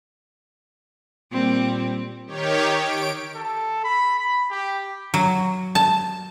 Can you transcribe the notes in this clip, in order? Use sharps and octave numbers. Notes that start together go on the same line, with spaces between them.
A#2 G3 A#3 C4
D#3 G4 C#5
D7
A4
B5
B5
G4
F#3
A5